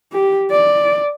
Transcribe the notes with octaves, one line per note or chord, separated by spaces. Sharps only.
G4
D5